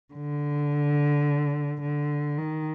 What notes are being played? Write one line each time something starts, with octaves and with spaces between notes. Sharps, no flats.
D3
D3
D#3